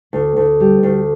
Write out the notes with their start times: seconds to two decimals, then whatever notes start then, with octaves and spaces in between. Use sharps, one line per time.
0.13 D2
0.37 D2
0.60 G3
0.83 D2